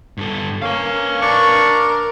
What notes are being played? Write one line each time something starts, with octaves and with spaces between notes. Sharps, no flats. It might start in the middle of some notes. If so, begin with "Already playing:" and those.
G2 A4
A#3 C#4 B4 F5
D4 A#4 C#6